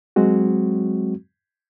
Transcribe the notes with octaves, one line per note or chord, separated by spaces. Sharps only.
F#3 G#3 C4 F#4